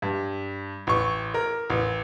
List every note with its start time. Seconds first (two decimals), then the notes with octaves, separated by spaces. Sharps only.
0.02 G2
0.87 A1 C#6
1.34 A#4
1.70 A1